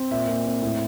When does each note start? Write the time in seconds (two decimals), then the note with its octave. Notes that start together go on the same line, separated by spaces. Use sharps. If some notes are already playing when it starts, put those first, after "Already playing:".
Already playing: C4
0.11 A#2 E5
0.28 A#2
0.45 C4
0.62 A2